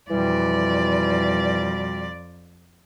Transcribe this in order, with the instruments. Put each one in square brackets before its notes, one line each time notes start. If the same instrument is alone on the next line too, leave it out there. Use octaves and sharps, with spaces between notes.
[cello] F2 D5 [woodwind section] B2 G3 [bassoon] E3